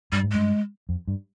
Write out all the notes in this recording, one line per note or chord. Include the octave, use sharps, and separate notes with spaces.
G2 G3
G#2
G2 G#3
F2
G2